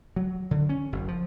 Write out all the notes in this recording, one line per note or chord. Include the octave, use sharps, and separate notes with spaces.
F#3
D3
C#4
F#1
F3